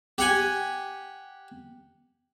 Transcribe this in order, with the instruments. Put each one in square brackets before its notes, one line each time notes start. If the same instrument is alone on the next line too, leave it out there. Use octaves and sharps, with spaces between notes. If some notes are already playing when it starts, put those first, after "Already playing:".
[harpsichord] G4 F#5 G#5